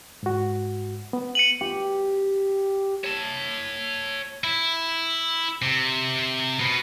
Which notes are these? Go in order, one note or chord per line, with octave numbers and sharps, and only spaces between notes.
G#2 F#4
B3
C#7 D#7 F#7
G4
C#5 A5
E4
C3
B2 B3